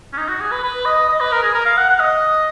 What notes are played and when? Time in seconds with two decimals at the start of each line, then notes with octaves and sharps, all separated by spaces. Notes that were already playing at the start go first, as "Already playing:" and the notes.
0.13 C#4
0.18 D#4
0.28 F#4
0.40 G#4
0.52 B4
0.63 B4
0.85 D#5
1.08 D#5
1.21 B4
1.32 A#4
1.43 G#4
1.54 A#4
1.66 F5
1.77 F#5
1.89 F#5
2.00 D#5